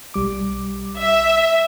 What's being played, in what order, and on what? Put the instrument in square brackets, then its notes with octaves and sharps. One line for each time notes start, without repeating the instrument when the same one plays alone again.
[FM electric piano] B1 G3 D6
[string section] E5